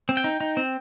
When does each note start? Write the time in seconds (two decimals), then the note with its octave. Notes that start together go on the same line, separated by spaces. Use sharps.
0.09 C4
0.17 G5
0.24 D#4
0.41 D#4
0.57 C4